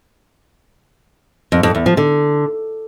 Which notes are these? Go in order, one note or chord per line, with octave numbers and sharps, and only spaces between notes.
F2
F2
E2
F3
D3